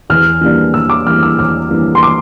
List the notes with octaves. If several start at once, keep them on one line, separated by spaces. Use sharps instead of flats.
E2 F6
E3 G3 A#3 D4
E2 E6
D6
E3 G3 A#3 D4 F6
E6
E2 F6
E3 G3 A#3 D4
C6
D6